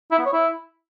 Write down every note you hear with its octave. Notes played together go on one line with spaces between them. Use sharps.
E4
B3
C#5
E4